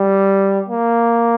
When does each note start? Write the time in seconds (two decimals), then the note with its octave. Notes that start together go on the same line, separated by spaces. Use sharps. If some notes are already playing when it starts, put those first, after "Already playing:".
Already playing: G3
0.69 A#3